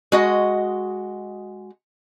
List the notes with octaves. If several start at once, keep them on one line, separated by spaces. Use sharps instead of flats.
G#3 F#4 D#5